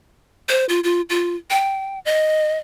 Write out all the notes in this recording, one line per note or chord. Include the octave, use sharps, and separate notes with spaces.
C5
F4
F4
F4
G5
D#5